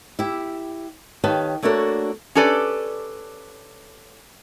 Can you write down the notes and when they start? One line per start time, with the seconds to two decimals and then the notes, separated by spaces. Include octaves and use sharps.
0.19 E4 G4
1.24 D#3 G4 B4 C#5 F5 A5
1.62 A3 A#3 D4 F#4 A4 C#5
2.35 C#4 G4 A4 B4 D5